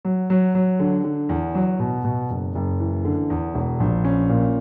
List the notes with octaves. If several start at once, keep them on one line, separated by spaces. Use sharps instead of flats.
F#3
F#3
F#3
D3
D3
E2
F#3
B2
B2
F#1
F#1
E3
D3
E2
E1
A#1
C#4
A#2